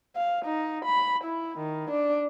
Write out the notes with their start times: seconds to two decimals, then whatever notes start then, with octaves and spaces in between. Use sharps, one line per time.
0.16 F5
0.45 D#4
0.85 B5
1.24 E4
1.59 D#3
1.91 D4